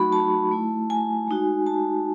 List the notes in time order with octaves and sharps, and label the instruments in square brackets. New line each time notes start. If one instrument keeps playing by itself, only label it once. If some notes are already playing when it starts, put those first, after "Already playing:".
Already playing: [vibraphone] F#3 A3 D#4 F#4 B5 C#6
A5
A3 E4
G#5
G#3 D#4 F#4
A5